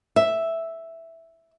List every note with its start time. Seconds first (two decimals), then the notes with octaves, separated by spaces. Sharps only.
0.16 E5